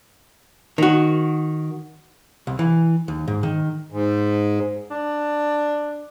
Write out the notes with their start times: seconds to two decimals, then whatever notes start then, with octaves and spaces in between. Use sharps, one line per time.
0.78 D#3 F#4
2.47 C2
2.59 E3
3.08 D#2
3.28 G#2
3.43 D#3
3.92 G#2
4.91 D4